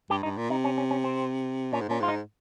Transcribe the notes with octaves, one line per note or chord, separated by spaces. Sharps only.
G2 G4
G2 D#4
A#2
C3 D#4
C#4
C#4
C#4
C4
A#2 C#4
G#2
A#2 C#4
G#2 F4
D#4